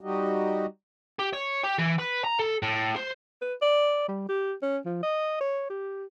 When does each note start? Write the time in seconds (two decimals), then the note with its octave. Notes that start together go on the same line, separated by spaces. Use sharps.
0.01 G3 D#4 F#4 G4 D#5
1.19 G4
1.34 C#5
1.64 G4
1.79 E3
1.99 B4
2.24 A#5
2.39 A4
2.62 A2
2.96 C5
3.42 B4
3.62 D5
4.09 G3
4.29 G4
4.62 C#4
4.85 F3
5.03 D#5
5.41 C#5
5.70 G4